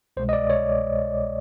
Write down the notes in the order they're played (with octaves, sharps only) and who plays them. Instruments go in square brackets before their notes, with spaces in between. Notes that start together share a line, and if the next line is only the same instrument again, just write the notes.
[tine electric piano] C2 B2 G#3 C5
D#5
D5
C#5